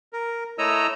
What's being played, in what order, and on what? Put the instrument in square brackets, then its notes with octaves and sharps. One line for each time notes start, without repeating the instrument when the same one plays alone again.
[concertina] A#4
A3 E4 C#5 D#5 A#5 E6